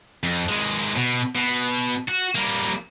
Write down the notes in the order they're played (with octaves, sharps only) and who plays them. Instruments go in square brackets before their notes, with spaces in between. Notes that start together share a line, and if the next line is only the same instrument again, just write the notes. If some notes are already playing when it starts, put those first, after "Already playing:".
[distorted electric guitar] F2
D#2 G#3
B2
B2
F#4
G3 A#3